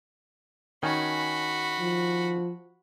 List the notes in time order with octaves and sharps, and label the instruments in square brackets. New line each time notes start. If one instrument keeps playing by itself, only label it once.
[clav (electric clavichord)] D#3 C#4 G#5 [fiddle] F#4 B5
[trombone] F3